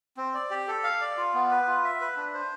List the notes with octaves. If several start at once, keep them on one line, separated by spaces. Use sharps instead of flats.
C4
D5
G4
A4
F5
D5
F4
B3
B4
F4
E5
B4
D4
C5